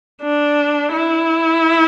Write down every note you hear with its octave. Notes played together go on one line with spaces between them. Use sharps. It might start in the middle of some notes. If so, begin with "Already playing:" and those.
D4
E4